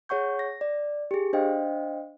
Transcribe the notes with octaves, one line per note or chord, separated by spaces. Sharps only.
G#4 C#5 F#5 C#6 G6
A#6
D5
G4 G#4
D4 C5 D#5 F5 G5